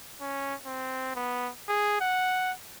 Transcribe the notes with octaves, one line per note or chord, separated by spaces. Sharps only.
C#4
C4
B3
G#4
F#5